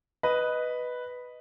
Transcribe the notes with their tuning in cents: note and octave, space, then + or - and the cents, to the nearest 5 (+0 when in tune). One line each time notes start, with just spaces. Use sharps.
B4 +0 D#5 +0